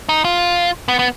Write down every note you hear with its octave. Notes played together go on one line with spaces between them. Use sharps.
D#4
F4
B3
B3